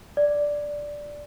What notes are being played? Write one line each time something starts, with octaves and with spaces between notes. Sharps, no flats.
D5